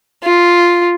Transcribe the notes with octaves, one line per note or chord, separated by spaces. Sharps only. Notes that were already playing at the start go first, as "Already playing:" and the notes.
F4